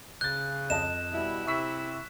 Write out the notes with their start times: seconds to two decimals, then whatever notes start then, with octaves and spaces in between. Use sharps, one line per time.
0.21 C#3 F#6 G6 A6
0.70 F2 D#5 A5 E7
1.11 B2 G3 E4
1.47 C3 E4 C#6 E6 B6